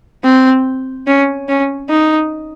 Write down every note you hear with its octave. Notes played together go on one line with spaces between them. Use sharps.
C4
C#4
C#4
D#4